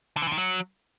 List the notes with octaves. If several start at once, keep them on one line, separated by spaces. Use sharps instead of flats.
D3
E3
D3
D#3
F#3